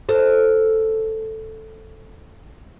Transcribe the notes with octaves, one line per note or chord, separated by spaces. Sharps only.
A4 C5